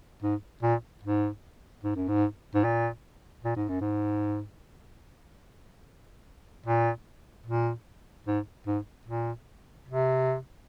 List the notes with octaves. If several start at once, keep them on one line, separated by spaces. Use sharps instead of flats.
G#2
A#2
G#2
G#2
F#2
G#2
G#2
A#2
A#2
G#2
F#2
G#2
A#2
A#2
G#2
G#2
A#2
C3